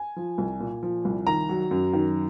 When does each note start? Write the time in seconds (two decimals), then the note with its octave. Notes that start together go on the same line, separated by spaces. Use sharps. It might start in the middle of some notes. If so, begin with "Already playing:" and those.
Already playing: G#5
0.16 F3
0.38 C2
0.60 A#2
0.83 F3
1.05 C2
1.27 D#3 A#5
1.49 F#3
1.71 F#2
1.93 D#3